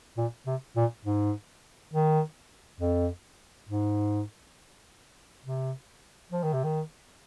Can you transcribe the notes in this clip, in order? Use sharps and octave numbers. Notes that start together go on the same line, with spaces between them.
A#2
C3
A#2
G#2
D#3
F2
G#2
C3
F3
D#3
C3
D#3